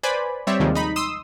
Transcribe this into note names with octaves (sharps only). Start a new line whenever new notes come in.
B4 C5 D5 G#5 B5
G3 C4 C#5 D5 E5
D#2 C3 D#3 F3 G3 G#3
D#4 B5
C6 D#6 E6